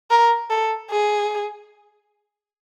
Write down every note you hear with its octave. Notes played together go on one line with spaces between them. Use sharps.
A#4
A4
G#4